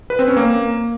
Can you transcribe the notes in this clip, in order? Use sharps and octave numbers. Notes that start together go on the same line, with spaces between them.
B4
C4
C#4
A#3